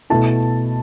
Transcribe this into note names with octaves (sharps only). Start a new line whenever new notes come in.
B2 A3 E4 A5